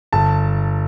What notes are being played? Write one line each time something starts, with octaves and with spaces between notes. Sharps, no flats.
G1 A5